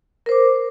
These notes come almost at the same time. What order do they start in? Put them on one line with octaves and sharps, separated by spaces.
A#4 C5 D6